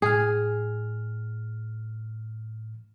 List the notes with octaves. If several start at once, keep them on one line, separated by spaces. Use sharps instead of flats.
A2 G#4 F6